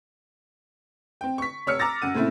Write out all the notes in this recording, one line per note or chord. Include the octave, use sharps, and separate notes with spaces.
C4 G5
C#6 B6
F1 C#5 E6 F6 C#7
A#5 D6 E6 A6 A#6
F#2 F#5 D#7
A#2 C#3 A3 C4 E4